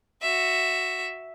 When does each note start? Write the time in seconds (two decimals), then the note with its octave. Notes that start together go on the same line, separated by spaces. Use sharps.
0.22 F#4 E5